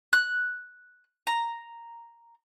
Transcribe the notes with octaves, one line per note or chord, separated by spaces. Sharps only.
F#6
A#5